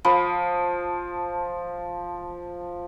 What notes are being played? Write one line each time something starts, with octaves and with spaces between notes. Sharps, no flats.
F3 B5